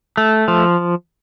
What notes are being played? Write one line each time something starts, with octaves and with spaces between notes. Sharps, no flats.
A3
F3